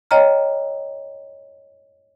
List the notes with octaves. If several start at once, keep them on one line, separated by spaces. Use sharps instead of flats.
C#5 D#5 G5 A#5 F6